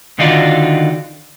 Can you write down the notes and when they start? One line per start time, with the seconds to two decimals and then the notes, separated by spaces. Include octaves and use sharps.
0.19 D3 D#3 D#4 F4 F#4 D5